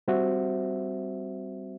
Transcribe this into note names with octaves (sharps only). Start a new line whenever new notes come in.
G3 C4 F#4 C5 E5